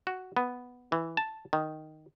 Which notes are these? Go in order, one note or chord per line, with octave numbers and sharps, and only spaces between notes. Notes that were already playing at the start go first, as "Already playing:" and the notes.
F#4
B3
E3
A5
D#3